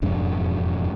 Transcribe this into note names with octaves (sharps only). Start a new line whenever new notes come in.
E1 F2 G#2 D4